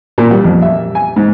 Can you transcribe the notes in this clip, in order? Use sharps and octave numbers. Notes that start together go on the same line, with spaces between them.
A#2
G3
F2
E5
G#5
G#2